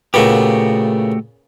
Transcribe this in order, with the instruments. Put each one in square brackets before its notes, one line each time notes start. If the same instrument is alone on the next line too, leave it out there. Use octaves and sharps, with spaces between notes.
[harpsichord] A#2 C#3 B3 [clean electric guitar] A3 F#4 G4